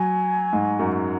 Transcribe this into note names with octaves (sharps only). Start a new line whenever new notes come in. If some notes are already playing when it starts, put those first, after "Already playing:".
Already playing: F#3 G#5
G#2
F#2